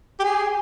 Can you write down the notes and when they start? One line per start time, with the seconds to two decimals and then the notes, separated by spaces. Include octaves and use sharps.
0.19 G4
0.23 G#4